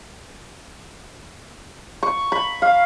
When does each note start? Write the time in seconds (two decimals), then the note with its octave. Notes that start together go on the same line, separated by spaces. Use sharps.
2.03 C#6
2.32 B5
2.62 F5